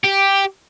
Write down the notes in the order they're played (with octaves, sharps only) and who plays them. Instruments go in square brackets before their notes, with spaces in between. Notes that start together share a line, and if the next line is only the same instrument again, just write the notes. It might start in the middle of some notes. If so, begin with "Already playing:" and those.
[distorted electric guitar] G4